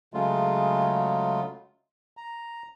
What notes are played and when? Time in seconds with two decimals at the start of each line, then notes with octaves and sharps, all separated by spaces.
0.14 C#3 F#3 G#3 A3 F4
2.17 A#5